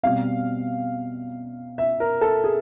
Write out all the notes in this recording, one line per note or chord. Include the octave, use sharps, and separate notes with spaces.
B2 G3 C4 F5
E5
A#4
A4
G#4